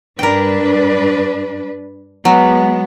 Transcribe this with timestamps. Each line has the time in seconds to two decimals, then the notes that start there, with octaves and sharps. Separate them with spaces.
0.19 G2 D4 A#4 B4 G5
2.25 F#3 G#3 B3